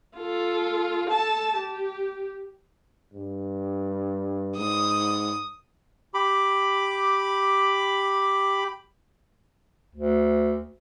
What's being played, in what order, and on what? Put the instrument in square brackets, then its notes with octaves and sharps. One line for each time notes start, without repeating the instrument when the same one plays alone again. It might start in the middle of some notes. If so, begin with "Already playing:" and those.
[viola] F4 A4
A4 A5
G4
[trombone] G2
[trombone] G#2 [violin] D#6
[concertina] G4 B5 D6
[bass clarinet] D2